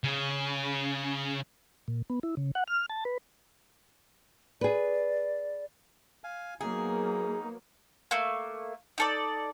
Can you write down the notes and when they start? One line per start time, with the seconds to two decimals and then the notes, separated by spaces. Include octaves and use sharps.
0.04 C#3
1.88 A#2
2.10 B3
2.23 E4
2.37 C#3
2.55 F#5
2.67 F6
2.90 A5
3.05 B4
4.61 G#4 B4 D5
6.24 F5 G#5
6.61 F#3 A#3 B3 D#4 G#4
8.11 A3 A#3
8.98 D#4 A4 D5